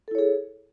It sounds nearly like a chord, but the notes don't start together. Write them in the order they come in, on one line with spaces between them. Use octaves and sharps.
A4 E4 C#5 G#4